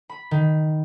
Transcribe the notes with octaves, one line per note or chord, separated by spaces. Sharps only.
B5
D#3